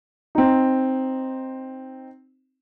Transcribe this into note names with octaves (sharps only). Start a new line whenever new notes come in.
C4 D#4